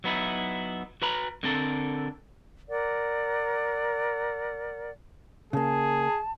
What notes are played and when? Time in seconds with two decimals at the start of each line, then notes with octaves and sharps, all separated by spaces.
0.04 F#3 B3 D#4 E4
1.02 F#4 B4 A#5 B5
1.43 D3 C4 A4 A#4
2.68 A#4 D5 F#5
5.53 C#3 A#3 G#4 A5